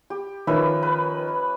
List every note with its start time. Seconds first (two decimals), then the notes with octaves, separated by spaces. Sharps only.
0.10 G4
0.47 D#3 F3 C#4 B4 E5
0.83 B4